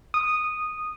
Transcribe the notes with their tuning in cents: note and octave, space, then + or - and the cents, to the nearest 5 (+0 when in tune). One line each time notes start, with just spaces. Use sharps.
D#6 -10